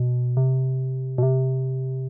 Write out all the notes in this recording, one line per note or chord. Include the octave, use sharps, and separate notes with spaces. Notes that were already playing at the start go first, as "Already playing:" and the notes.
Already playing: B2
C3
B2
C3